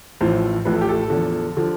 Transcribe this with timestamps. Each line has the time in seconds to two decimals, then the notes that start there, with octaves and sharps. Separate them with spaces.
0.21 A1 A2 F3 C5
0.65 A1 A2 F3 B4
0.73 A4
0.81 G4
0.89 A4
1.10 E2 D3 F3
1.57 D3 F3